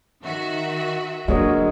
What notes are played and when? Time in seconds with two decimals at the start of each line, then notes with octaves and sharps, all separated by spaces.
0.22 D#3 F#4 E5
1.28 D3 F#3 G#3 A#3 A#4 C#5 D#5